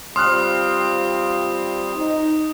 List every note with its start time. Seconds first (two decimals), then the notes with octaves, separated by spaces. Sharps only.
0.16 G3 C4 F4 C6 D#6 F6 F#6
1.95 D#4